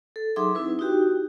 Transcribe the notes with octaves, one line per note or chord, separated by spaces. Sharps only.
A4
F#3 D#4 G#4 E5 C6 D6
C4 D#4 E4 B4
D#4 E4 F#4 G4 G5